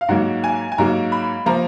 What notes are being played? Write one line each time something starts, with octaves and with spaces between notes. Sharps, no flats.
F5
G#2 F#3 A#3 F#5
G#5
G#5
G#2 F#3 A#3 A#5
B5
F3 A#3 A#5